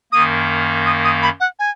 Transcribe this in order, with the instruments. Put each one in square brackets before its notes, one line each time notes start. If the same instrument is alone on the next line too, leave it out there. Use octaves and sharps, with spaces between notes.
[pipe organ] F#2 D#3 A#3 [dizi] D#6
[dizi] D#6
D#6
B5
F#5
G#5